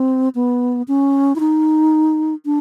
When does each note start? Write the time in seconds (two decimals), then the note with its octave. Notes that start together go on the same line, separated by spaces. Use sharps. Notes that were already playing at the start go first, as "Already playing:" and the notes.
Already playing: C4
0.35 B3
0.88 C#4
1.36 E4
1.40 D#4
2.45 D4